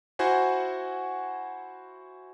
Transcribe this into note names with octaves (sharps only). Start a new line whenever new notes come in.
E4 F#4 C5 F#5 G#5